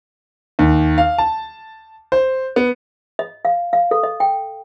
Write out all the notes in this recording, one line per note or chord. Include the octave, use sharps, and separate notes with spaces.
D#2
F5
A5
C5
B3
D#5
F5
F5
A4
D#5
G5